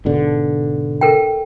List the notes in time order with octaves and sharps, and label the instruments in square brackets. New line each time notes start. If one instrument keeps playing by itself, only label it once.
[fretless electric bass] G#2 B2 D3
[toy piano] A4 A#4 G5